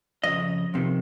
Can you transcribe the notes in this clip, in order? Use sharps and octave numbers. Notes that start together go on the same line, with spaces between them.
F2 C#3 D#5
F2 C3 D#3